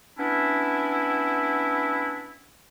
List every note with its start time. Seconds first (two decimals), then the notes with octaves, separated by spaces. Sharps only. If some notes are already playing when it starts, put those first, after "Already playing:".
0.18 B3 C#4 D4 E4